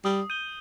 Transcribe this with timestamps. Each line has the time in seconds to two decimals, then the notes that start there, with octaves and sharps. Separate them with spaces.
0.05 G3 D#6
0.30 G6 D#7 G7